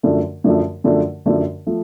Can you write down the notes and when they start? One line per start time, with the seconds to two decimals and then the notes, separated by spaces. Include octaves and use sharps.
0.03 F#2 D3 F3 A3
0.44 F#2 D3 F3 A3
0.84 F#2 D3 F3 A3
1.26 F#2 D3 F3 A3
1.67 F3 A3